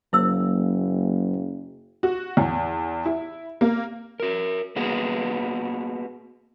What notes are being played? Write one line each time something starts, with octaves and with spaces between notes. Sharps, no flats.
F#1 F#3 A#3 E4 C5 E6
F#4
E2
E4
A#3
F#4 A#4
A#3 B3 F#4 G#4